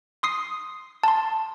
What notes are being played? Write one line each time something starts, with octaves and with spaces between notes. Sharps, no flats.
C6 D#6 C7
A5 C6